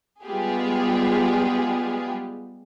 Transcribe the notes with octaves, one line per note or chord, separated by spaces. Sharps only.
G3 G#3 B3 F4 G4 G#4